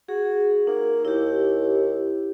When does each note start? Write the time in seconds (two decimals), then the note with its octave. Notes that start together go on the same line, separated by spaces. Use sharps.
0.09 F#4 G#4
0.67 A#3 D#4
1.05 D#2 E4 G4